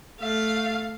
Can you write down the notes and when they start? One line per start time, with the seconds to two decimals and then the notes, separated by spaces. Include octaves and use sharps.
0.21 A3 F5